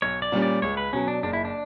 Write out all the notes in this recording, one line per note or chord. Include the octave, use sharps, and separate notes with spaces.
B1 C#5
D5
A#2 G3 C#4
D5
C#2 C#5
B4
B2 F#3 C#4
D4
F#1 D4
E4
D4